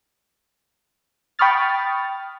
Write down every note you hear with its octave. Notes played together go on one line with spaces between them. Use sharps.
G5 B5 C#6 D#6 F6 A6